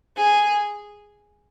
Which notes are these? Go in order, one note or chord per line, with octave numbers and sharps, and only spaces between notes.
G#4